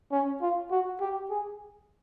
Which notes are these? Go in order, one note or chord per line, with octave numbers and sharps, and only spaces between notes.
C#4
F4
F#4
G4
G#4